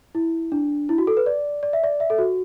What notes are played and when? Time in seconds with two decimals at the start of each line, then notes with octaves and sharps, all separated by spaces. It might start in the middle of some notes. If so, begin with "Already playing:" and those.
0.15 E4
0.52 D4
0.89 E4
0.98 F#4
1.07 A4
1.17 B4
1.26 D5
1.63 D5
1.73 E5
1.84 D5
2.00 E5
2.10 A4
2.18 F#4